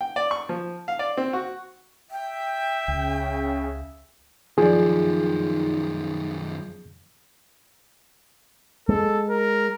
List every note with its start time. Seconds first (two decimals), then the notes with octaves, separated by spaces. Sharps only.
0.01 G5
0.16 D5
0.31 C#6
0.49 F3
0.88 F5
0.99 D5
1.17 C4
1.33 F#4
2.11 E5 G5
2.88 C#2 C#3
4.58 F#2 D#3 F3 D#4 G#4 D5
8.89 G#3 A4
9.30 A#4